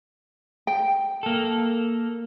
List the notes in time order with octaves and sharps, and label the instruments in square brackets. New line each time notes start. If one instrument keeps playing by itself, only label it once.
[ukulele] G5
[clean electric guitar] A#3 A4